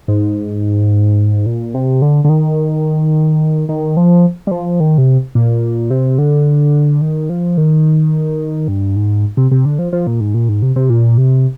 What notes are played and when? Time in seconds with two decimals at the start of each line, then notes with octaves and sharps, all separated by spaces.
0.08 G#2
1.46 A#2
1.74 C3
2.02 D3
2.25 D3
2.29 D#3
3.69 D#3
3.97 F3
4.47 G3
4.51 F3
4.80 D#3
4.98 C3
5.35 A#2
5.90 C3
6.18 D3
7.01 D#3
7.30 F3
7.57 D#3
8.68 G2
8.96 G#2
9.37 C3
9.51 C3
9.65 D3
9.79 F3
9.93 F3
10.07 A#2
10.20 G#2
10.34 A#2
10.49 G#2
10.62 C3
10.76 C3
10.90 A#2
11.18 C3